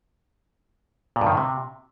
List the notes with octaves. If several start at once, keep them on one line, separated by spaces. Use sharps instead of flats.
A#2
G2
D#3
A2
C3